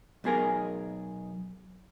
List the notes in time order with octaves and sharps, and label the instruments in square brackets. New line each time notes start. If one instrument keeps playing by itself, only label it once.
[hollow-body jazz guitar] B1 B2 G#4 A#4